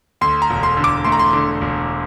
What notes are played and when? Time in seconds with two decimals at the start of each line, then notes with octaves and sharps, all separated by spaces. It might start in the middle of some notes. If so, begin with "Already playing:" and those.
0.21 D2 C6
0.42 A#5
0.50 E1
0.63 C6
0.77 D3
0.84 D6
1.05 A3 C6
1.12 A#5
1.19 C6
1.33 D3
1.61 E1